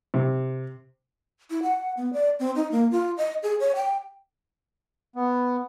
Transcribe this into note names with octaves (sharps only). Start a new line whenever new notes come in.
C3
E4
F#5
B3
D5
C4
D#4
A#3
F4
D#5
G#4
C#5
G5
B3